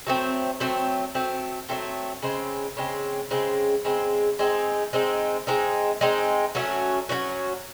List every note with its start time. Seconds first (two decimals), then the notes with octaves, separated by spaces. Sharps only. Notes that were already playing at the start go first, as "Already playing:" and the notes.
0.07 F#3 A3 C4
0.60 F#3 A3 C4
1.15 F#3 A3 C4
1.69 F#3 A3 C4
2.22 C#3 G#3 C4
2.77 C#3 G#3 C4
3.31 C#3 G#3 C4
3.85 C#3 G#3 C4
4.39 G#3 C4 D#4
4.93 G#3 C4 D#4
5.47 G#3 C4 D#4
6.01 G#3 C4 D#4
6.55 F#3 A3 C#4 F#4
7.09 F#3 A3 C#4 F#4